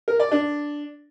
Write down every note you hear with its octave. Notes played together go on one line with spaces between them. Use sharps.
A#4
D5
D4